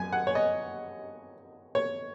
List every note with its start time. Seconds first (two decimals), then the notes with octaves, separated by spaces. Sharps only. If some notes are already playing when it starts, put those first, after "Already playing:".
Already playing: F#2 G#5
0.12 F#5
0.27 C#5
0.35 D#5
1.75 C#5